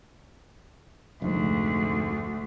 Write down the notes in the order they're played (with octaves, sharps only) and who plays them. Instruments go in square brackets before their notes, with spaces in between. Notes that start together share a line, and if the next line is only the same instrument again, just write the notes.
[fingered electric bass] F1 G#2 [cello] D2